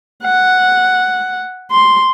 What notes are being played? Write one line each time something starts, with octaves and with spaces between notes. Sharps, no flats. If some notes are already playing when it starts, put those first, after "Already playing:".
F#5
C6